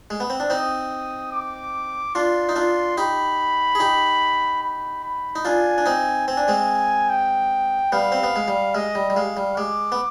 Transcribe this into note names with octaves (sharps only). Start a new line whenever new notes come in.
G#3
B3
C4
D4
C4 D#4 D#6
D6
D4 F4 C6
D#4
D4 F4
D#4 G4 B5
G#4
D#4 G4
B5
B5
D#4
D4 F4 G#5
D4
C4 D#4
C4 G#5
D4
G#3 C4
G5
G3 B3 F5
C4
B3
G#3
G3
G#3 D#5
G3
G3
G#3 F5
G3
G#3 D6
B3